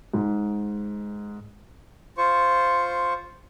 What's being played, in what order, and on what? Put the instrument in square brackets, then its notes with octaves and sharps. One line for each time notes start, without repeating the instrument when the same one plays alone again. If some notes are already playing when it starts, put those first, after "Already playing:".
[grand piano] G#2
[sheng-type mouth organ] F4 C5 C#6